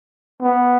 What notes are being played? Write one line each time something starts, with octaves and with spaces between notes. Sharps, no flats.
B3